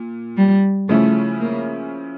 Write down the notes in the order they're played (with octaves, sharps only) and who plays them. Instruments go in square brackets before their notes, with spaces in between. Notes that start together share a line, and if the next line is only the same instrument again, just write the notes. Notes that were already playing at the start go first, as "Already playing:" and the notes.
Already playing: [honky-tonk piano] A#2
[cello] G3
[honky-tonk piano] C#3 F3 C#4 E4 [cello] A3
[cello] A#3